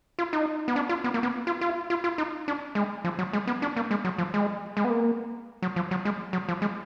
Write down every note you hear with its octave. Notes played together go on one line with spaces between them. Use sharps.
F4
D#4
B3
D4
F4
B3
A#3
B3
F4
F4
F4
F4
D#4
D4
G#3
F3
F#3
G#3
B3
D4
A#3
G#3
F#3
F3
G#3
G#3
B3
A#3
F#3
F3
F#3
G#3
F#3
F3
G#3